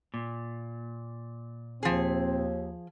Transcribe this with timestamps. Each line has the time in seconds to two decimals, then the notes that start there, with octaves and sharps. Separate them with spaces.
0.14 A#2
1.83 D#2 F3 C4 G#4